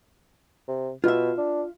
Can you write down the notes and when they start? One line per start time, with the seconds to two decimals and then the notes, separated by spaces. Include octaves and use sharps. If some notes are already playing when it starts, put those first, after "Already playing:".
0.68 C3
1.04 B2 F4 E5
1.37 D4